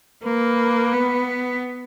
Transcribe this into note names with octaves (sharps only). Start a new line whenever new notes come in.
A#3 B4
B3